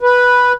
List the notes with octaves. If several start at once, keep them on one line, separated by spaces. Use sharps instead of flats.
B4